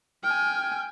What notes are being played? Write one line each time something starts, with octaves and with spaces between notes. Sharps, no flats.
G5 G#5 F6